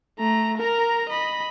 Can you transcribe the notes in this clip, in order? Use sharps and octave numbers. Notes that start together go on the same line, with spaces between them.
A3 A#5
A#4 A#5
D#5 B5